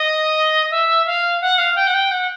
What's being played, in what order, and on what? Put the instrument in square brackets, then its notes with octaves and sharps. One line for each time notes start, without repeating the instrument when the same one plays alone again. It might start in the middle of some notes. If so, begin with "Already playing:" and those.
Already playing: [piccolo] D#5
E5
F5
F#5
F5
G5
F#5
G5
F#5